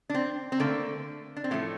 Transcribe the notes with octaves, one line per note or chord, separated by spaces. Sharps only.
D4
C4
C4
D3 A3 A#3
D4
C4
A2 F3 A3 A#3